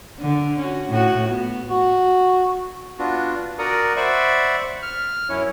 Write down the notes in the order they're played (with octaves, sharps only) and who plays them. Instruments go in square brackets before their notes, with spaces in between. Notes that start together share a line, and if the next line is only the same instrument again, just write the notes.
[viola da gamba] D3
C#4 F#4
A2 F#4
B3
[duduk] F#4
[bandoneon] B3 D4 F4 F#4
F#4 A#4 D5 F#5 A#5 D#6
C5 D5 E5 F#5 B5 C#6
F6
F#2 C#4 E4 C#5